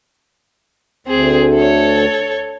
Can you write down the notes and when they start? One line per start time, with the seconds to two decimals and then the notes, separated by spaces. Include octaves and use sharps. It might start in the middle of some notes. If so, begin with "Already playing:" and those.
1.07 D2 C4 G#4
1.54 A4 C#5